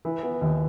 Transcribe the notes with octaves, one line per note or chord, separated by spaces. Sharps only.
E3
B3
D#2